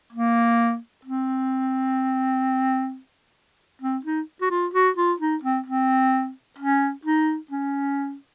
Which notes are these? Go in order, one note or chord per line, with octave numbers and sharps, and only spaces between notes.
A#3
C4
C4
D#4
F#4
F4
F#4
F4
D#4
C4
C4
C#4
D#4
C#4